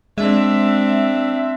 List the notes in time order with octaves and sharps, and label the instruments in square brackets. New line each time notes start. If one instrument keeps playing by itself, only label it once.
[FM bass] G#3 [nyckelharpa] C4 D4 [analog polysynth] E5